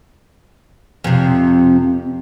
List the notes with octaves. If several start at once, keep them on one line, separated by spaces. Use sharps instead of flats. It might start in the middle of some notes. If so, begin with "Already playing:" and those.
F2 C3